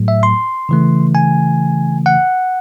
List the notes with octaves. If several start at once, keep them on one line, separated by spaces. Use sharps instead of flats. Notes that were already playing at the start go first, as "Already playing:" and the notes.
Already playing: A2 F#3 A3
E5
C6
C#3 E3 A3
G#5
F#5